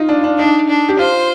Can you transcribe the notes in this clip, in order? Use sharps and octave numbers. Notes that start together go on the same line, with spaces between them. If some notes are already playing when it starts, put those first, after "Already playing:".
Already playing: D#4 F4
D4
D4
D4 D#4
D4
G4
F4 C5